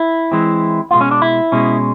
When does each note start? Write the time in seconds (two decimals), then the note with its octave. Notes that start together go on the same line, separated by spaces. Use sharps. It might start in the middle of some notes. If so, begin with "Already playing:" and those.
Already playing: E4
0.32 E3 G#3 C4
0.91 B2 G#3 B3 F4
1.01 C#4
1.11 D4
1.22 E4
1.52 B2 G#3 C#4